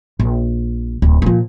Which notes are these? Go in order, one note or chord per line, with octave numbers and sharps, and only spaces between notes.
A#1
D1
A#2 F3